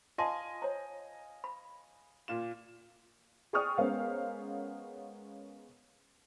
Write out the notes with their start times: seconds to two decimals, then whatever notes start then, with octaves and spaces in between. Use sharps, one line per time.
0.18 F4 D#5 F5 G#5 A5 C6
0.62 C#5 A#5
1.44 B5
2.28 A#2 F4 E7
3.53 G#4 D5 G5 C#6 D#6 F6
3.78 G#3 B3 C#4 A#4 C5 F5